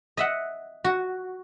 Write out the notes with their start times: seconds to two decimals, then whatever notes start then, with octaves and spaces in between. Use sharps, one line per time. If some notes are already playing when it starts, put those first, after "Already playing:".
0.17 D#5 E5 F#5
0.84 F#4